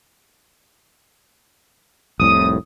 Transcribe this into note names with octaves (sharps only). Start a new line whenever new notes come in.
F1 C2 A2 D#6